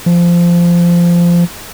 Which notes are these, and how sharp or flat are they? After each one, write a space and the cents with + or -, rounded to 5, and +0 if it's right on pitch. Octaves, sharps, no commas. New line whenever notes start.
F3 -15